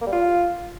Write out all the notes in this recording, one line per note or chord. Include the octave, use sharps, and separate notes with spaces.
A#3
G3
F4